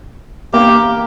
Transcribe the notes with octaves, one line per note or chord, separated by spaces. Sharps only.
A#3 G4